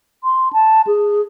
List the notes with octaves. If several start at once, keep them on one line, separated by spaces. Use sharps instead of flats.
C6
A5
G#4